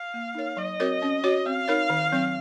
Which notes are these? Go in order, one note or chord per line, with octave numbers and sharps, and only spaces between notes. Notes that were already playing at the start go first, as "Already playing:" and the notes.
Already playing: F5
A#3
D#4 A#4 C#5
F#3 D#5
C4 F#4 A#4 C#5
C#4
F#4 C#5
C4 F5
D#4 A#4 C#5
D#3
F#3 C4